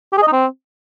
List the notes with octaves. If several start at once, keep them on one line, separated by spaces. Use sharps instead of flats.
G4
G#4
D#5
D#4
C4